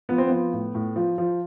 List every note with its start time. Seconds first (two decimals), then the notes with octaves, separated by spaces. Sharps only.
0.09 F3 B3
0.18 C4
0.28 F3 B3
0.53 A2
0.75 A2
0.96 F3
1.18 F3